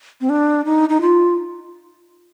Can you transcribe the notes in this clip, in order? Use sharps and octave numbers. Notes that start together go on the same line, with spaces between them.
C4
D4
D#4
D#4
F4